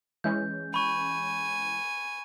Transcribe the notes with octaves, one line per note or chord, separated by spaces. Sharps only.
E3 G#3 C#4 G6
G#5 B5 C#6